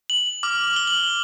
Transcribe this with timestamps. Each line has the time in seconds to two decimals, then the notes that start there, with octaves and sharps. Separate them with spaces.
0.10 F#7
0.43 D6 F6
0.76 G7
0.87 F#7